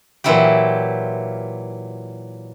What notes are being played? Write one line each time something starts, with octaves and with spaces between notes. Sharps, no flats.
A#2 E3 F#3 E4 F4 G4